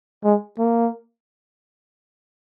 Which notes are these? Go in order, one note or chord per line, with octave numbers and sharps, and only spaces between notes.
G#3
A#3